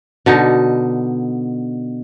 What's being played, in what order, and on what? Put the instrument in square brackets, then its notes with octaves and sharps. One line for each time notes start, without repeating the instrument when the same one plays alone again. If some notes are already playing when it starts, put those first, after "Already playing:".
[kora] B2 D3 D#4